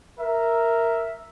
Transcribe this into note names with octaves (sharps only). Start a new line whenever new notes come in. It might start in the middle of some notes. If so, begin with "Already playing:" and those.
A#4 E5